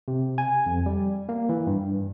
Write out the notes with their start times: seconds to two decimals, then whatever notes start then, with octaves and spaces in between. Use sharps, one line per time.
0.08 C3
0.38 G#5
0.66 F2
0.86 G3
1.29 A#3
1.49 E3
1.67 G2